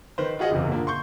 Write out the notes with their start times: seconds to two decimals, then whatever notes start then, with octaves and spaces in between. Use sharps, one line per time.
0.18 D#3 B4 C5
0.39 F4 F#4 G#4 D#5 F#5
0.51 F#1 E2 C3
0.67 A#2 D3 A#3
0.87 C6 C#6 G6